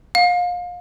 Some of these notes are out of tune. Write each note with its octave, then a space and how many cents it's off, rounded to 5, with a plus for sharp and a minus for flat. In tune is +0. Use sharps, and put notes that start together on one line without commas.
F5 +30